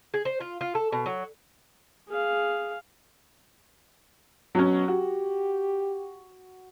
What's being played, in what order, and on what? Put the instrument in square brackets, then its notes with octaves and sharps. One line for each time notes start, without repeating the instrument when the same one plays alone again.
[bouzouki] G#4
C5
F4
F4
A4
B2
F#3
[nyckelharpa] G#4 F5
[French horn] B2 [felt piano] F#3 C#4
[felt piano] F#4 [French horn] G4